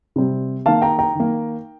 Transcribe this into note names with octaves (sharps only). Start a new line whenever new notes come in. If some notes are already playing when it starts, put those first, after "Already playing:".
C3 G3 C4
D#3 A#3 F5 A5
G5 A#5
G5 A#5
D#3 A#3